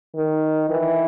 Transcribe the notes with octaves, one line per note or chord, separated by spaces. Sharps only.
D#3
E3